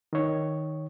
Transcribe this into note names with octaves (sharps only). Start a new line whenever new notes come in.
D#3 C#5